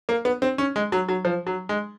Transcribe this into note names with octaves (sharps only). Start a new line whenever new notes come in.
A#3
B3
C4
C#4
G#3
F#3
F#3
F3
F#3
G#3